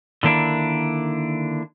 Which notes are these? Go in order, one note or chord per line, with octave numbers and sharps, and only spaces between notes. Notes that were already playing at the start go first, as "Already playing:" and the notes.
D3 D#3 A#3 D4 E4